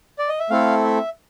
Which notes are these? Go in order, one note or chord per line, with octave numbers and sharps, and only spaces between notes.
D5
D#5
E5
A3 C4 E4 A4 F5
E5